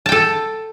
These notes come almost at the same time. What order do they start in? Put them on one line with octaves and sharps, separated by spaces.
A5 G5 A4